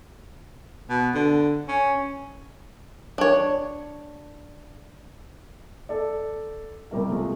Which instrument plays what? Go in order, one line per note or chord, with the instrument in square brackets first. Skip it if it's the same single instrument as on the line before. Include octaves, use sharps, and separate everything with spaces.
[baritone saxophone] B2
D3
C#4
[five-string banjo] D4 C#5
[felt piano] A4 D5
[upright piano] C2 A#4 E5 [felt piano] G3 A3
[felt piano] F3 G#3 A3